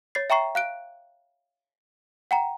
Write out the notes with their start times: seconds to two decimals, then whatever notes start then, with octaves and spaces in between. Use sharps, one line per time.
0.15 C#5 A6 C7
0.30 E5 G5 A#5 C#6 C7
0.55 F5 F#6 D7
2.31 F#5 G5 A#5